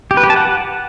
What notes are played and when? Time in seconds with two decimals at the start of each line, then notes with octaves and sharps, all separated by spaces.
0.11 G4
0.17 B4
0.23 G4
0.30 A5
0.36 F#5